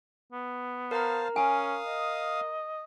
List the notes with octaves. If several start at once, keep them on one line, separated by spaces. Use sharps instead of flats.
B3
A#4 C5 F5 A5 A#5
C#4 F5 G#5 D#6
D#5